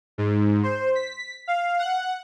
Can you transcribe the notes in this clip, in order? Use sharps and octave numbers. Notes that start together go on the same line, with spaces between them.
G#2
C5
B6
F5
F#5